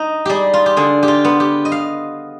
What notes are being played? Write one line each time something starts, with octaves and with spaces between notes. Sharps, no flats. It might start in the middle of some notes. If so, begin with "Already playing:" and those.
Already playing: D#4 D#5
G3 G4 G#4
F4
G4
D3 G#4
G4
F4
B3
G4
D#5
F5